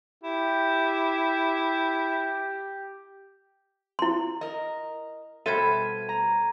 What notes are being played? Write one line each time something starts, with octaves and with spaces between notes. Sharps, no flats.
E4 G4
E4 C6
A#4 D#5
B2 G3 A4 C5 E5 G#6 D#7
A#5